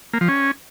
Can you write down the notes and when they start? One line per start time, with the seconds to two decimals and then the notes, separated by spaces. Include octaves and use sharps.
0.13 A#3
0.21 F3
0.28 C#4